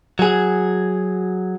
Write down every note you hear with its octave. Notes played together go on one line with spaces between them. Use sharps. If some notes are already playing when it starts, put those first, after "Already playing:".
F#3 G#4